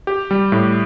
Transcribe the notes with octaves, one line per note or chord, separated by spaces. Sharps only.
G4
G3
A2